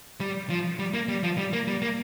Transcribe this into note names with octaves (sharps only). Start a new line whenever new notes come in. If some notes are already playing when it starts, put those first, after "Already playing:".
G3
F3
G3
A#3
G3
F3
G3
A#3
G3
A#3